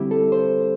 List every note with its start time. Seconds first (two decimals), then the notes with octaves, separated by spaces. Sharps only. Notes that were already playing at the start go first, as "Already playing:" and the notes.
Already playing: D3 G3 C4 E4 G4
0.11 A4
0.32 C5